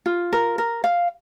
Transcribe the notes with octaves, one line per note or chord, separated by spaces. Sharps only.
F4
A#4
A#4
F5